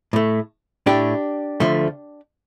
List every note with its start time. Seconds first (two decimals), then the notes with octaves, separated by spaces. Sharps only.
0.13 A2 A3
0.86 A2 A3 D4 G4
1.60 D2 D3 F3 A3